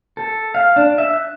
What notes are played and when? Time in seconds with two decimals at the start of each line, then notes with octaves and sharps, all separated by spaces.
0.17 A4
0.55 F5
0.76 D4
0.98 E5
1.14 F#6